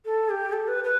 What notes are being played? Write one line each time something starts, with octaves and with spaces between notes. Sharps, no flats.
A4
G4
A4
B4
B4